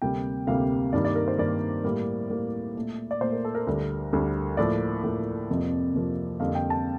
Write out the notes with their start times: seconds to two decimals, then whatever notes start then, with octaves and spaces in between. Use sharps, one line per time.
0.02 D2 C3 G3 A#3 G5
0.47 D2 C3 G3 A#3 F5
0.93 G2 D#3 G3 A#3 D5
1.05 D5
1.16 A#4
1.28 C5
1.38 G2 D#3 G3 A#3 D5
1.84 A2 G3 A#3
2.30 A2 G3 A#3
2.75 A#2 A3
3.11 D5
3.21 A#2 A3 C5
3.33 A#4
3.45 A4
3.55 A#4
3.67 D2 D3 G3
4.13 D2 D3 G3
4.57 A2 F3 A#3 D5
5.03 A2 F3 A#3
5.49 F2 C3 F3 A#3
5.94 F2 C3 F3 A#3
6.40 F2 D3 G3 A#3 F5
6.55 G5
6.70 A5